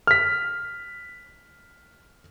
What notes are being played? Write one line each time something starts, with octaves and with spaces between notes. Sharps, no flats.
F6 B6